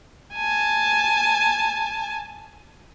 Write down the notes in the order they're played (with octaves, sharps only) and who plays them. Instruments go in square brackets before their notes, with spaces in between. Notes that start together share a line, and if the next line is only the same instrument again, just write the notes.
[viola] G#5 A5